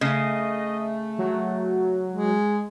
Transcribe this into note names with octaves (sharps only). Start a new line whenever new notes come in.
C#3 A3 D#5
F#3
G#3